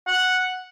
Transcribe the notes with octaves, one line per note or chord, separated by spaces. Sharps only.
F#5